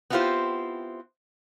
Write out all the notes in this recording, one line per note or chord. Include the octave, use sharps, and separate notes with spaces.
B3 C4 E4 F4 G4 C5